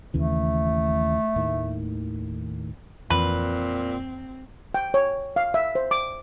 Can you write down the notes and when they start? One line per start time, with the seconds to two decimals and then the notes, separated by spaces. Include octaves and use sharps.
0.14 D#2 C#3 E3 A3
1.36 D#2 A2 D#3
3.10 F2 A#2 E3 C4 B4
4.74 G5
4.94 C#5
5.36 F5
5.54 E5
5.75 C5
5.91 D6